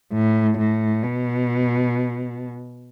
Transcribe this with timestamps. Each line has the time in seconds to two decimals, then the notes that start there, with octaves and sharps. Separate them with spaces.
0.13 A2
0.59 A2
1.03 B2